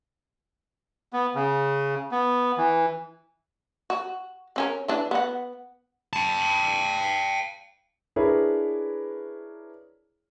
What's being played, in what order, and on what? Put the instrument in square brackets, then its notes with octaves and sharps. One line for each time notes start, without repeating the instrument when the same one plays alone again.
[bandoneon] B3
C#3
B3
E3
[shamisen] F#4
C4 C#4 A#4
E3 D4
B3 F#5
[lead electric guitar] G5 A5
[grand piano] D4 E4 G#4 A#4 B4 C#5